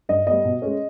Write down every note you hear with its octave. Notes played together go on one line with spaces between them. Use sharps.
G2 D#5
G3 B3 D#5
B2
G#3 C#4